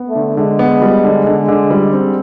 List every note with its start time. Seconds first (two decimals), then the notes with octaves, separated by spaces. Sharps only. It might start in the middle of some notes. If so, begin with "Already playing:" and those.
Already playing: B3
0.08 A3
0.15 D3
0.37 D3 G#3
0.59 B3
0.82 G3
1.04 D3
1.26 D3
1.48 D3
1.70 G3
1.93 C4